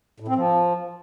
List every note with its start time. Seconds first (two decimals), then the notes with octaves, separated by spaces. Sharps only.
0.20 A2
0.28 C4
0.36 F3